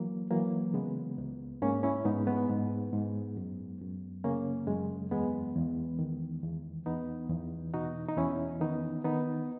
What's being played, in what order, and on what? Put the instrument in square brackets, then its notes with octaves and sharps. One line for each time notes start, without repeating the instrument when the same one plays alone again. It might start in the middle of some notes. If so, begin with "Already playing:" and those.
Already playing: [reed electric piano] E3 F#3 A#3
E3 F#3 A#3
C#3 G#3 B3
C#2
G#2 A#3 C#4
C#4 E4
G#2 B3 D#4
G#3 B3
G#2
G#2
F#2
F#2
C#3 A#3 C#4
F#2 G#3
E2 G#3 B3
E2
D#3
E2
E2 B3 D#4
E2
B2 D#4 F#4
D#4
E2 C#4 E4
D#3 B3 D#4
D#3 B3 D#4